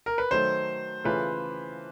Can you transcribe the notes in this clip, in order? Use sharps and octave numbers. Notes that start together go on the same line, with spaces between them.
A#4
B4
D#3 F#3 A3 C5
C#3 E3 A3 C#4 F4 B4